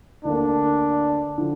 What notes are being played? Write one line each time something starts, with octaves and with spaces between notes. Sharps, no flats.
D2 D3 A#3 D4
D3 F3